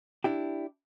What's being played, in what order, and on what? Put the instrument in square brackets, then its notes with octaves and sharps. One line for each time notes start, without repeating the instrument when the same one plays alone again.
[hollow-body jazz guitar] D4 E4 G4